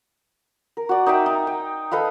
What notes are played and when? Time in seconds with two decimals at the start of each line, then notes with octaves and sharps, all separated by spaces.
0.77 A#4
0.89 F#4 D5
1.06 D#4 D5 E5 G5
1.26 D#4
1.47 G5
1.91 A4 B4 D#5 F5